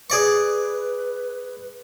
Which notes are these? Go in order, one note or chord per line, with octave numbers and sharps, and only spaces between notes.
G#4 B4 D5 C#6